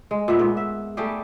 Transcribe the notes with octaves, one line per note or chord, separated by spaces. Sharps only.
G#3
A#2 B3 E5
G#2 B3
E5
G3 A3 G4 G#4